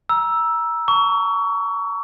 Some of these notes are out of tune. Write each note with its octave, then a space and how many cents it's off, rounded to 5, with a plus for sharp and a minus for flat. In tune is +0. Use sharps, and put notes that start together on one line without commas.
A#5 +25 E6 +0
A#5 -45 C#6 +30